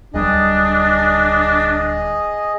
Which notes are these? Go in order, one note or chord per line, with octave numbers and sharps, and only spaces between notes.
D1 G3 D4 G#4 D#5